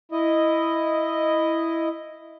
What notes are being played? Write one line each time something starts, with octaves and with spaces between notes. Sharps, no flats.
E4 D#5